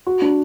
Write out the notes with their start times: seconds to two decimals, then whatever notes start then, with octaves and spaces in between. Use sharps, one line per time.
0.07 F#4
0.22 D4